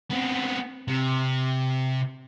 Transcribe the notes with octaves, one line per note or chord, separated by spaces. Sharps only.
B3 C4
C3